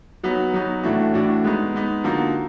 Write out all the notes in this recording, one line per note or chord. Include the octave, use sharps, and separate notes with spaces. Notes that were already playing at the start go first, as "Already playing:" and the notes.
F#3 B3 D#4 F#4
F#3 B3 D#4 F#4
A2 E3 A3 D4 F#4
A2 E3 A3 D4 F#4
G#3 B3 D#4
G#3 B3 D#4
D3 F3 A#3 D#4 F#4